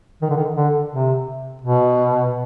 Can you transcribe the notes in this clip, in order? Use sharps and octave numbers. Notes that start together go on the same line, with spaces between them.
D#3
D3
D#3
D3
C3
B2